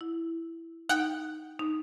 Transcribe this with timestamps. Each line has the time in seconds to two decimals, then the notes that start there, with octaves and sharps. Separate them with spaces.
0.01 E4
0.89 D#4 F#5 G5 F#6
1.60 D#4